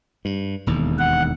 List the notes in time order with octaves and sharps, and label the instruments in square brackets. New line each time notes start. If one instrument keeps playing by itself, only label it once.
[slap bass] G2
E1 D#2
[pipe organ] F#5